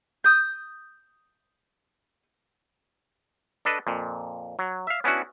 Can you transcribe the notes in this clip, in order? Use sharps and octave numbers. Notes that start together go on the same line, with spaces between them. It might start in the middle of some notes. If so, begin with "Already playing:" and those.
D#6 G6
D4 A4 B4 D#5
F2 A#2
F#3
E5 F5
B3 C#4 D4 E4 F#4